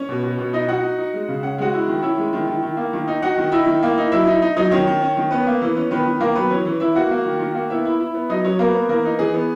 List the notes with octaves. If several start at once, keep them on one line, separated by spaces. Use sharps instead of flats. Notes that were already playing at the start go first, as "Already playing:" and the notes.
Already playing: C#4 C#5
B2
B2
B2
D#4 D#5
D#4 F#4 F#5
D#4
D#4
G#3
C#3
C#4 F#5
G#3 F#4 F#5
E4
D#3
C#4 E4 E5
G#3
D#3
D#3
D#3
A#3
D#3
D#4
D#4 F#4 F#5
D#3
D#4 E4 E5
D#3
A#3
D#4
F#3 E4 E5
D#4
D#4
F#3 D#4 D#5
D#3 C#4 C#5
D#3
C#4
D#3
B3 C#4 B4
A#3
E3
C#4
D#3 B3 B4
D#3
D#3 A#3 A#4
F#3 B3 B4
E3 C#4 C#5
E3
E3 E4 E5
A#3 F#4 F#5
A#3
D#3
D#3
A#3
B3 E4 E5
E4
E4
B3
F#3 D#4 D#5
F#3 C#4 C#5
A#3 B3 A#4
B3
E3 A#3 A#4
D#4
E3 G#4
B3